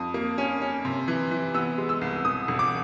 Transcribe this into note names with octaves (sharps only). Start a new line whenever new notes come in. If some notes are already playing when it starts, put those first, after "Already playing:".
Already playing: F2 D#6
A#3
C#4
C#4
C3
E3
E3
B3 E6
G#3
E6
C2
E1 D#6
E1
D6